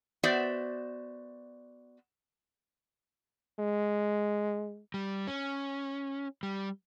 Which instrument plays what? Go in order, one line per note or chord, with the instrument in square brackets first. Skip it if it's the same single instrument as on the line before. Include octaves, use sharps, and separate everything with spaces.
[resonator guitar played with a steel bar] B3 F#4 C5 D5 E5
[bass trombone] G#3
[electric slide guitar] G3
C#4
G3